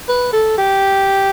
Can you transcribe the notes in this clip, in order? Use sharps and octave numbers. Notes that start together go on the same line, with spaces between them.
B4
A4
G4